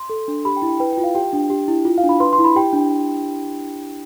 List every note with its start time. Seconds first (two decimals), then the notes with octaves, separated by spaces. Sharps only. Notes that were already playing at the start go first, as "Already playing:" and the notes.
Already playing: C6
0.09 A4
0.28 D4
0.45 G4 B5
0.57 G5
0.62 E4
0.69 G5
0.80 B4 G5
0.92 G5
0.98 F4
1.04 F5
1.15 G4 G5
1.33 D4
1.50 G4
1.68 E4
1.85 F4
1.98 F5
2.03 D4
2.09 B5
2.20 B4 C6
2.33 C6
2.38 E4
2.44 B5
2.55 G4 G5
2.73 D4